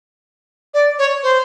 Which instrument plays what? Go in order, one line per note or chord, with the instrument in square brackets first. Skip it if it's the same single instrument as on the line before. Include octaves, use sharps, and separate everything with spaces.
[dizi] D5
C#5
C5